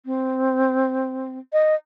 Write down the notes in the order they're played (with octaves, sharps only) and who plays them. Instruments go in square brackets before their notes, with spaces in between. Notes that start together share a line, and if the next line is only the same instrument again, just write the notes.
[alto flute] C4
D#5